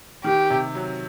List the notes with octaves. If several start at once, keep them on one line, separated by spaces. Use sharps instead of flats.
D#3 G4
C3
F#3